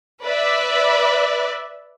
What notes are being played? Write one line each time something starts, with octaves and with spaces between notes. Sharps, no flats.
B4 D5 E5